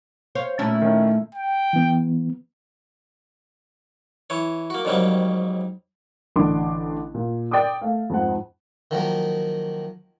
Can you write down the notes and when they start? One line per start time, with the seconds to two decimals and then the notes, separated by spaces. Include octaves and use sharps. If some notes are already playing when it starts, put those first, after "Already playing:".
0.35 C5 C#5 F5
0.59 A#2 A3 C#4 E4
0.82 D#3 C#4
1.35 G5
1.73 E3 B3
4.30 E3 C#5
4.70 A#3 F#4
4.85 F2 G#2 C#3 F#3 G3 A#3
6.36 A1 D3 D4 C6 D6
7.14 A#2
7.51 D5 G5 C6 D6 D#6
7.82 A3 F5
8.10 F2 G#2 F#5
8.91 D#3 F3 F#3 A#3